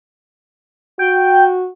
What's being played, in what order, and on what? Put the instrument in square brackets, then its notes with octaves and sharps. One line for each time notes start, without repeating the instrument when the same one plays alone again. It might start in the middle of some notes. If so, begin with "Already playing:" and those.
[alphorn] F#4 [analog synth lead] G5